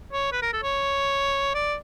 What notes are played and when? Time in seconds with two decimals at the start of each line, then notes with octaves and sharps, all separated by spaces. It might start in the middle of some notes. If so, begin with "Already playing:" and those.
0.13 C#5
0.32 B4
0.42 A#4
0.53 A4
0.63 C#5
1.54 D5